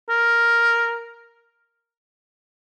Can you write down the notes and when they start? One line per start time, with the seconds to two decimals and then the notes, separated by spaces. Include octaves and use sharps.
0.10 A#4